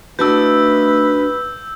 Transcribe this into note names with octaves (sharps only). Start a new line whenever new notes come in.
A3 D4 D#4 F#4 B4 E6 G6